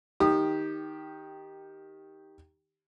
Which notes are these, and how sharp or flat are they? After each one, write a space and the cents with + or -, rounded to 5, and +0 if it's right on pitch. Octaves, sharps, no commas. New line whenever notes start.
D#3 +5 G4 +0 D#6 -30